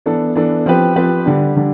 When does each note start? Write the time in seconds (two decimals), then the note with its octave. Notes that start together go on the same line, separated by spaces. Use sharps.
0.06 E3 B3 D4 A4
0.35 E3 B3 D4 A4
0.66 F3 C4 G4 B4
0.96 F3 C4 G4 B4
1.26 D3 G3 D4
1.56 D3 G3 D4